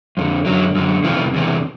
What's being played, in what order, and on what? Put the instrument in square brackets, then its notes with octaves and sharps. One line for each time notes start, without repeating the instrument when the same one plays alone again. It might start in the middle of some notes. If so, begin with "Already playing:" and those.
[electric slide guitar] F2 D3
F#2 D3 F#3
F#2 D3
E2 C3 E3 F3
E2 C3 E3